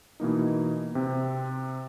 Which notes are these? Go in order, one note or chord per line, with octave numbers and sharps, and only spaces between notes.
B2 E3 A#3 D#4
C3 C4